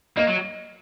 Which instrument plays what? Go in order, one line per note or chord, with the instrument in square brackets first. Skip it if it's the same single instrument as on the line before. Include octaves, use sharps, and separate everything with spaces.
[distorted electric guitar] A#3 [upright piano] D#5
[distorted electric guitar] F#3